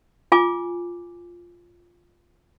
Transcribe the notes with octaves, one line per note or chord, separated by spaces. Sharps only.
F4 G#5 D6